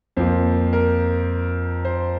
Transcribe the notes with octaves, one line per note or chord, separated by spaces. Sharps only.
F2 F3 A#3 C5
A#4
C5